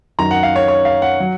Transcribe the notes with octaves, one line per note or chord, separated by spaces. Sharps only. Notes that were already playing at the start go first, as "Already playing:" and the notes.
F#2 D#3 F#3 A#5
F#5
F5
C#5
C#5
F5
F#5
F#3